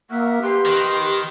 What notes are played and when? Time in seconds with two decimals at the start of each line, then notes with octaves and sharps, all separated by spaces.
0.11 A#3 F#4 A#4 E5
0.42 G4 B4 C6
0.65 D#3